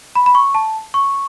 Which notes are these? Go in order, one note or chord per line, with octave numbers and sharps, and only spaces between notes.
B5
B5
C#6
A5
C#6